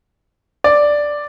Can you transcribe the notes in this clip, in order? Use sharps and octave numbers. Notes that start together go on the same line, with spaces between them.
D5